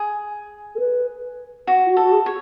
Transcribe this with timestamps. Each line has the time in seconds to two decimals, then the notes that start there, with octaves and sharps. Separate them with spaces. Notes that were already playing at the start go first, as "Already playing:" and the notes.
Already playing: G#4
0.75 A4
0.79 B4
1.67 F#4
1.86 F4
1.89 F#4
1.97 A4
2.03 F#4
2.12 G#4
2.26 C#5